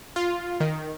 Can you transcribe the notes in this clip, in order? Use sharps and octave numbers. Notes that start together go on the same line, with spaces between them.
F4
D#3